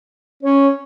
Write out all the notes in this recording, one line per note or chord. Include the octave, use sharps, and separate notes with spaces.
C#4 C#5